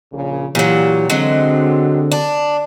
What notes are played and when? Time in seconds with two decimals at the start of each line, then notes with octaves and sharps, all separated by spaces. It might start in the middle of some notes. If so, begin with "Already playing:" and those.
0.13 A#1 A#2 C#3
0.55 A#2 E3 F#3 F#4 G4
1.10 D3 F#3 G#3 C4
2.12 D4